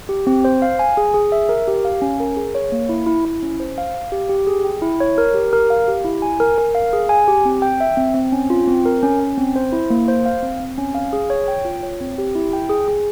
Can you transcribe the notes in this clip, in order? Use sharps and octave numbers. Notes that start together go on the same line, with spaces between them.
G4
C4
C5
F5
G#5
G#4
G#4
E5
A#4
G4
F5
C#4
A#4
G#4
C#5
A#3
E4
E4
E4
C#4
C5
F5
F5
G4
G4
G#4
G5
E4
C#5
A#4
G4
A#4
F5
G4
E4
G#5
A#4
A#4
F5
G#4
G#5
G4
C4
G5
E5
C4
C4
C#4
F4
C4
A#4
C#4
C#4
C4
C5
E4
A#3
C5
F5
C4
C4
C#4
F5
G#4
C#5
G5
F4
C#5
C4
G4
E4
G5
G#4
G#4